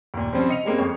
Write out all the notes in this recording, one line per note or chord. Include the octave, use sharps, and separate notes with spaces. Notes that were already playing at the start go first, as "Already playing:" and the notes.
D#2 A#2
F3 G3 C4 C#4 C5
D#5 C#7 F7
G3 G#3 A#3 C4 C#4
F2 C#5